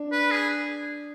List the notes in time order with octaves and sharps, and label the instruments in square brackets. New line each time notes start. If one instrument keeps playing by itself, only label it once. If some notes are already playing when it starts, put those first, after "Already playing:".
Already playing: [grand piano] D4
[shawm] B4
G#4